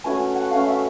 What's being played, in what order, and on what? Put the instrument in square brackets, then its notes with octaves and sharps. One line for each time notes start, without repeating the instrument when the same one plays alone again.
[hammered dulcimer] A3 C#4 F#4 B4 [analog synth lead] G#5
[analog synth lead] F#5
[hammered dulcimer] A3 C#4 F#4 B4 [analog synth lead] F5
[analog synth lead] E5